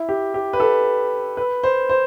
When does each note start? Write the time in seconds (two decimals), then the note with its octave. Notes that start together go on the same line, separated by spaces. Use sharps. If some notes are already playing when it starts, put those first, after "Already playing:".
Already playing: E4
0.09 G4
0.34 G4
0.53 B4
0.60 A4
1.37 B4
1.63 C5
1.89 C5